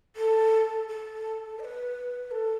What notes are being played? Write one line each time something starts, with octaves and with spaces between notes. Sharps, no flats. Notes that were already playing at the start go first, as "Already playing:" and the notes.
A4
A4
D#5
B4
A4